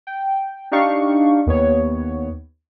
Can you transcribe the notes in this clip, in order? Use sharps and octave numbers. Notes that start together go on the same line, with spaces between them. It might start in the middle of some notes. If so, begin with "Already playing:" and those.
G5
D4 D#4 G4 F5 C#6
D#2 B3 C#5